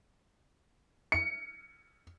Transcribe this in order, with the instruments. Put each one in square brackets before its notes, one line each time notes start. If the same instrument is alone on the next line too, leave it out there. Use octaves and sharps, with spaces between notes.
[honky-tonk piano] C#7